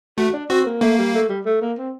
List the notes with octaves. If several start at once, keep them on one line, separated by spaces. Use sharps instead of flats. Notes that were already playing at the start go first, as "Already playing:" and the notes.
A3 F#4
D4
C4 F#4
A#3
A3 A#3
G3
A3
G3
A3
A#3
C4